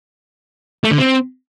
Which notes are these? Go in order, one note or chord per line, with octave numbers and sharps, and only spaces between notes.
A3
D3
C4